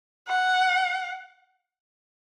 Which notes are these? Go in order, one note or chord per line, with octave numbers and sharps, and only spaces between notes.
F#5